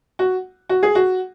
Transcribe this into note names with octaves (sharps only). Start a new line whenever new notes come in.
F#4
F#4
G#4
F#4